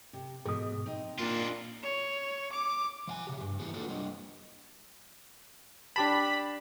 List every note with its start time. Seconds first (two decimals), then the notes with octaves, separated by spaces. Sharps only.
0.13 C3
0.46 G#2 B2 G#4 D#6
0.86 C4 D#4
1.18 A#2 D4 F4
1.83 C#5
2.52 D6
3.07 F3 F5 G#5
3.27 C#3 G4
3.41 G2
3.60 A2 E3 B3 E4 G#4
3.74 A#3 B3 D4 F4 F#4 A4
3.88 G3 D4 D#5
5.96 D4 G4 A5 B5